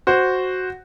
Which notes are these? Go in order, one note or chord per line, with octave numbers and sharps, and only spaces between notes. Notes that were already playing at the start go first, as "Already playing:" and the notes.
F#4 C5